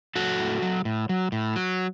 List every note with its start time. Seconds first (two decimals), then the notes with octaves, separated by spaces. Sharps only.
0.16 F#3 F#4 A4
0.39 A2
0.62 F#3
0.85 A2
1.09 F#3
1.32 A2
1.56 F#3